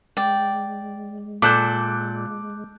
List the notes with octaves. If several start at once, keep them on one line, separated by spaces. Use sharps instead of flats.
G#3 D5 G5
A#2 A4 D6 F#6 G6